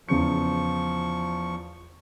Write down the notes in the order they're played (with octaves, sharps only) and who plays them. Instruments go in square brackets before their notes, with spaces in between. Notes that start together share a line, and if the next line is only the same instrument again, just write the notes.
[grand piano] E2 C#3 C#7 [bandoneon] F3 C#6